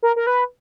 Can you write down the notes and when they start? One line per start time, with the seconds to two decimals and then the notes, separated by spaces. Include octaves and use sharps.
0.03 A#4
0.16 A#4
0.27 B4